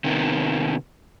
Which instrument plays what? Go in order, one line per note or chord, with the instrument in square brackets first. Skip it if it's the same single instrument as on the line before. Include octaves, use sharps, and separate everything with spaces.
[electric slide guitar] C3 D#3 A#3 B3